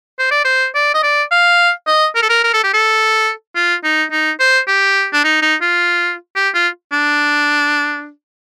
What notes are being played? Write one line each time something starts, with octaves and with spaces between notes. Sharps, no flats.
C5
D5
C5
D5
D#5
D5
F5
D#5
A#4
A4
A#4
A#4
A4
G4
A4
F4
D#4
D#4
C5
G4
D4
D#4
D#4
F4
G4
F4
D4